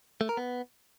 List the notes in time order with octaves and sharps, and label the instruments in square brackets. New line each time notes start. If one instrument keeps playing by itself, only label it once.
[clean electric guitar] A3
A#4
B3